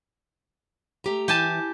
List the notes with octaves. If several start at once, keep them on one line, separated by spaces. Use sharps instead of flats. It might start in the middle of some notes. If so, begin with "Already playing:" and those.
A3 G4 A#5
E3 G4 G#5 A5